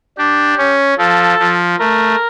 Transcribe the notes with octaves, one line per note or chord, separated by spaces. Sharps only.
D4 G4
C#4
F3 A4
F3
A3 A#4